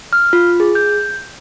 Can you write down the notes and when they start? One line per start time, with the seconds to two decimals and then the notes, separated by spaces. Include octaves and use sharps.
0.13 F6
0.33 F4
0.60 G#4
0.75 G6